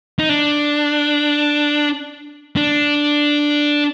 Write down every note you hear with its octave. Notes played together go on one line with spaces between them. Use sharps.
D#4
D4
D4